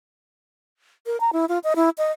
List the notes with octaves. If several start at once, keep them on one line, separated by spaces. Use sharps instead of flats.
A#4
A#5
E4
F4
D#5
E4
D#5